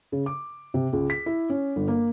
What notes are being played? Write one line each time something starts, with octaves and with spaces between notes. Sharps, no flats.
C#3
D6
C3
C#2
B6
E4
C#4
G1
A#3